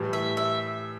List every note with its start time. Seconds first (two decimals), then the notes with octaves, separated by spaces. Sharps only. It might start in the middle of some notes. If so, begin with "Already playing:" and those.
Already playing: A2 E3 G3
0.13 E5
0.37 E5